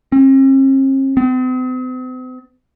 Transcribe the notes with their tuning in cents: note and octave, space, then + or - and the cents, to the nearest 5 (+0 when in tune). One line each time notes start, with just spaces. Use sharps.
C4 +45
C4 -45